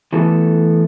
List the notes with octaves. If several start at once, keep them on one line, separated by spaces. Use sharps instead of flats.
E3 A3 B3 A4